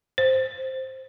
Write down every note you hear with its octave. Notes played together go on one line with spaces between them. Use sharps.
C5